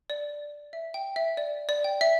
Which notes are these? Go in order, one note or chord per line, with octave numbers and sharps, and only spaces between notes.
D5
E5
G5
E5
D5
D5
G5
E5